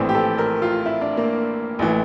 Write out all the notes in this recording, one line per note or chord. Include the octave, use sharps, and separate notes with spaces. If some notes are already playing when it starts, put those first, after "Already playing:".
Already playing: A#1 A2 E3 C4
G4
A4
A#4
F4
E4
D4
A#3
A1 A2 E3